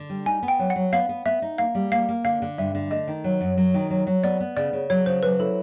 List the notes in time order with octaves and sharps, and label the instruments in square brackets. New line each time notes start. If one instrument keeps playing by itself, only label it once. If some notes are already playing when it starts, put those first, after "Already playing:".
Already playing: [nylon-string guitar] D3
G3
[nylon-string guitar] D#4 [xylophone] G#5
[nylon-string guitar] B3
[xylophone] G5
[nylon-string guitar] F#3
[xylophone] F#5
[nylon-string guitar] F#3
[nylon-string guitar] B3 [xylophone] F5
[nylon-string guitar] B3
[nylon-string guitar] B3 [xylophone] E5
[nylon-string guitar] D#4
[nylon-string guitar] A#3 [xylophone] F5
[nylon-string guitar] G3
[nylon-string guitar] A#3 [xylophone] F5
[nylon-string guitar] A#3
[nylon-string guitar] D3 [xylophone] F5
[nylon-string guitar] D3
[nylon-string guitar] G2 [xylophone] E5
[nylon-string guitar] D3
[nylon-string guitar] A3 [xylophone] D#5
[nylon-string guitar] D#3
F#3
F#2
F#3
D#3
F#3
F#3
[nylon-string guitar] B3 [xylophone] D5
[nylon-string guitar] B3
[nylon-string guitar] C#3 [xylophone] D5
[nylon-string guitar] C#3
[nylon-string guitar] F#3 [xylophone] C#5
[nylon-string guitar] C#3 [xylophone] C5
[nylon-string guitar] F#3 [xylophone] B4
[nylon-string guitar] E4 [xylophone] A4